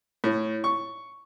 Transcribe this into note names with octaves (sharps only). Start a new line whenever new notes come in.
A2
C#6